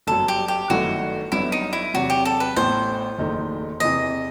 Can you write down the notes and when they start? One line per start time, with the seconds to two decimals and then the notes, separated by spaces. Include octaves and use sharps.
0.07 G1 F#2 F#3 A4
0.28 G4
0.48 G4
0.70 G1 F#2 D#3 A3 E4 F#4
1.32 G1 G2 F#3 B3 E4
1.52 D#4
1.73 E4
1.94 E2 C3 F#3 F#4
2.10 G4
2.25 A4
2.40 B4
2.56 A1 A2 E3 B3 C5
3.18 F#1 E2 D#3 A3 D#4
3.80 E2 C3 E3 D#5